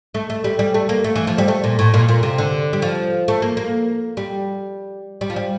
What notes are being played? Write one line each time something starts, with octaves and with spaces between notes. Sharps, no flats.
A3
A3
G3
G3
A3
A#3
A3
E3
F3
G3
A3
A#2
A2
A#2
A#2
C3
D3
G3
F3
A3
A#3
A#3
G3
G3
F3
G3